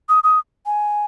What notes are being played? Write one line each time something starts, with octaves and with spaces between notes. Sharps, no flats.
D#6
D#6
G#5